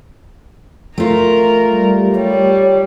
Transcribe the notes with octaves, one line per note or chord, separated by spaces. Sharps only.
A3 F4 A#4
G3
G3 C#5